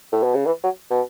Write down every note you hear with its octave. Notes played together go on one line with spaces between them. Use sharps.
A2
B2
C#3
E3
F#3
B2